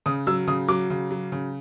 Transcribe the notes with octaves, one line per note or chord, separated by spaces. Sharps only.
C#3 D#6
F#3 E6
C#3 D#6
F#3 D6
C#3
F#3
C#3